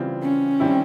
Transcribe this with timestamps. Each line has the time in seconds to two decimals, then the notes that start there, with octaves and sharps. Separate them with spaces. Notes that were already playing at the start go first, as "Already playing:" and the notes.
Already playing: C#3 E3 G3 C4 F4
0.23 C#4
0.60 D#3 G3 C4 E4